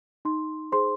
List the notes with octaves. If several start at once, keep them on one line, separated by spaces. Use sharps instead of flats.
D#4 C6
G#4 C5 C6